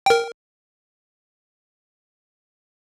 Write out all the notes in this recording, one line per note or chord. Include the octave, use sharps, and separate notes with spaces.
A#4 G5